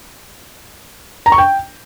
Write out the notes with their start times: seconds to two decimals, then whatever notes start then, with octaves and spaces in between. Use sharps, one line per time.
1.26 A#5
1.32 C#6
1.38 G5